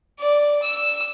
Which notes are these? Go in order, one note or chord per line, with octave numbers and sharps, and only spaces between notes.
D5
E6